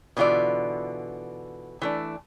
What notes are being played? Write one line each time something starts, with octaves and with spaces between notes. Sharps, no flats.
B2 D3 E3 F4 D5
E3 A3 D4